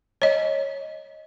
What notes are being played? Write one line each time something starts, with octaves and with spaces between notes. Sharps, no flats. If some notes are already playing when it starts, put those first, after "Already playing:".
C#5 D#5